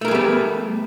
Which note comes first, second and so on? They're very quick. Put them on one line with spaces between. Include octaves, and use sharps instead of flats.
A3 A#4 G#4 G3 B3